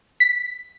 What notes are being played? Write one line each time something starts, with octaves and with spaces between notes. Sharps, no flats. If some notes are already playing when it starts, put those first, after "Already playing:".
B6